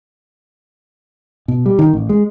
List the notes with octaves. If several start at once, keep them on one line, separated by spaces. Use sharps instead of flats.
B2
G3
D#3
A1
G#3